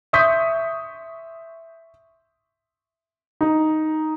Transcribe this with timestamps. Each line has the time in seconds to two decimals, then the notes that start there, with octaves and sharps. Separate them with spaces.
0.13 E5 C6 C#6 D#6 G6 B6
3.41 D#4